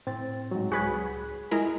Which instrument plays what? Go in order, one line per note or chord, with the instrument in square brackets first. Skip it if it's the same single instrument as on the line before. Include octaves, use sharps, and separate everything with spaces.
[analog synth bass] A2 [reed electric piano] C4 A6
[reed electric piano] G#2 F#3
[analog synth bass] C#2 [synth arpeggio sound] F#4 B4 C#5 [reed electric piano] G#4
[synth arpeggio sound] G#3 E4 A#4